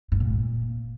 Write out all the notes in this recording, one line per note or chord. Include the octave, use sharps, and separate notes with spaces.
G#2
A#2